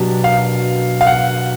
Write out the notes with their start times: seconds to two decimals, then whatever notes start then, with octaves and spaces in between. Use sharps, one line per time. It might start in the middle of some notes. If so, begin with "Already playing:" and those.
Already playing: B2 F#3 B3 D4 G4
0.24 F5
1.01 F5
1.07 F#5